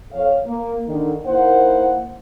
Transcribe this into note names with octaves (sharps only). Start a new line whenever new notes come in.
F2 A4 C#5 F5
A#3
D3 D#3
A#3 D#4 E4 A#4 C5 F#5